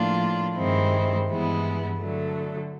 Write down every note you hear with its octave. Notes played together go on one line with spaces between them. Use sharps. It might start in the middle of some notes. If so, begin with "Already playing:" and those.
Already playing: A2 F3 A#3 D4 F4
G2 D#3 G#3 C4 E4
G2 E3 G#3 B3 E4
D3 F#3 A3